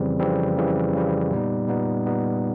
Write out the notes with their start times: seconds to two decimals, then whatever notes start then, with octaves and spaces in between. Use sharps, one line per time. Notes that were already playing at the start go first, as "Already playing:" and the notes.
Already playing: F2 C#3 E3 G3 C4
0.20 F2 C#3 E3 G3 C4
0.57 F2 C#3 E3 G3 C4
0.94 F2 C#3 E3 G3 C4
1.31 A#2 G3 B3 D#4
1.68 A#2 G3 B3 D#4
2.06 A#2 G3 B3 D#4